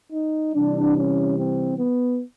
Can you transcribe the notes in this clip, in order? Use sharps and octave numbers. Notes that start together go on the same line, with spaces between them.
D#4
C3 E3 G3 D4
C#4
C4
B3